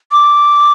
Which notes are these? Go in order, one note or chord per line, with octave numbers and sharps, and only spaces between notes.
D6